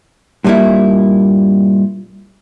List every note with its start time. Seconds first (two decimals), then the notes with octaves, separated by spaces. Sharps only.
0.44 G2 A#2 G3 A#3 E4